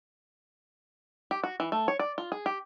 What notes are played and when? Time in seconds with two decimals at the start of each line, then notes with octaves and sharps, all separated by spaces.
1.31 G4
1.44 F#4
1.60 E3
1.72 A3
1.88 C#5
1.99 D5
2.18 F4
2.32 G#4
2.46 G4